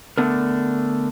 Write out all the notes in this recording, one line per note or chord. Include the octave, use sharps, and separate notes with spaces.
D3 A3 B3 D4 A#4